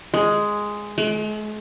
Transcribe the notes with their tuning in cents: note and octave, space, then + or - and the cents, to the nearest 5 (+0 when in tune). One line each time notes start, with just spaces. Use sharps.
G#3 +0
G#3 +45